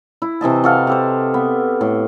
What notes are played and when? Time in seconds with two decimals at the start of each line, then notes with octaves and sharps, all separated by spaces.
0.22 E4
0.41 C3 E3 D#5 A5
0.64 F#4 A4 F5
0.87 G4 A4 C5
1.34 B3
1.81 A2